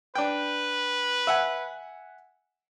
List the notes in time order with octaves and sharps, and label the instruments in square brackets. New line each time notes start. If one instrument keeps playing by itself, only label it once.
[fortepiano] D4 G5 [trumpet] B4
[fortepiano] E5 F#5 G#5